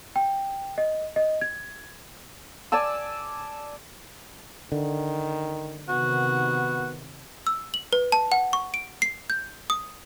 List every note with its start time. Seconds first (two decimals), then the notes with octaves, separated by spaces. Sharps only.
0.16 G5
0.78 D#5
1.16 D#5
1.41 G#6
2.72 D5 G#5 A5 E6
4.72 D3 D#3
5.89 C3 D#3 B3 F#4
7.47 E6
7.74 F#7
7.93 B4
8.12 A5
8.32 F#5
8.53 C#6
8.74 D7
9.02 C7
9.30 G6
9.70 D#6